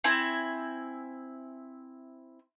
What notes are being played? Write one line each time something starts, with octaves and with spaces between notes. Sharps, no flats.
C4 E4 G#5